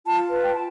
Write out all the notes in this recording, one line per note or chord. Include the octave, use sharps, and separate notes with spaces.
F4 A5
B4
G5
A5